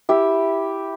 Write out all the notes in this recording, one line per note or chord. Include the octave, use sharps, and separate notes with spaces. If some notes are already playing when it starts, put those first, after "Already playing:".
E4 G4 E5